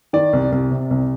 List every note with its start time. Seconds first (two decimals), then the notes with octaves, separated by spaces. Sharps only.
0.13 D#3 D5
0.33 C2
0.52 C2
0.71 C3
0.91 C2